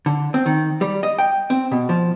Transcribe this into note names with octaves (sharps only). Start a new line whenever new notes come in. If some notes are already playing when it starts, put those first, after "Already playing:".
D3
C4
D#3
G3
D#5
G5
C4
B2
F3